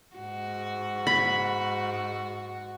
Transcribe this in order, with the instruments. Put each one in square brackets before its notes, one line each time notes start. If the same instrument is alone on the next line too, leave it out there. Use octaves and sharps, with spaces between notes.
[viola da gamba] G#2 F#4
[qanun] B5